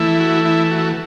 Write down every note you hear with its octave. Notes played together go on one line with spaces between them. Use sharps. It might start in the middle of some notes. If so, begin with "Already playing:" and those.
Already playing: E3 A3 E4
F#4
E4
F#4